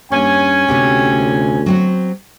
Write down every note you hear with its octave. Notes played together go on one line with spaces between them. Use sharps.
G2 A#3 C#4 G#5
D2 C3 B3 G4
F#3 C4 F#4